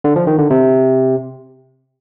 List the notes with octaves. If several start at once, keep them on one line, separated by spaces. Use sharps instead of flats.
D3
F3
D#3
D3
C3